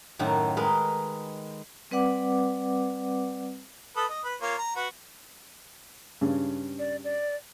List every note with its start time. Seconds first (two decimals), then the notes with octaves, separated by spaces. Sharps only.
0.19 F#2 A2 D#3 F#5
0.57 G#3 A#4 B4
1.91 G3 C4 B4 D5 F#5 D6
3.96 A4 B4 D#6
4.09 D#5
4.24 B4
4.42 A#3 F4 C#5
4.58 A#5
4.76 F#4 B4
6.21 G2 C#3
6.79 D5
7.04 D5